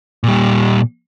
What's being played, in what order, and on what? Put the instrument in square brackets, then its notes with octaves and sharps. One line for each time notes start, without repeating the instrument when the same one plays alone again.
[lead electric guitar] A#2 G3